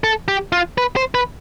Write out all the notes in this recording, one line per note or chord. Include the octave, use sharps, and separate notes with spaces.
A4
G4
F4
B4
C5
B4